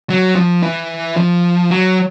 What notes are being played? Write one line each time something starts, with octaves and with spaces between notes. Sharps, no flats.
F#3
F3
E3
F3
F#3